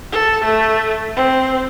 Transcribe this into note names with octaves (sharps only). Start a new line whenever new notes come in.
A4
A3
C4